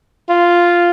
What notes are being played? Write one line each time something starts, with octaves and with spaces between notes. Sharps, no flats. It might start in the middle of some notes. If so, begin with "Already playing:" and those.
F4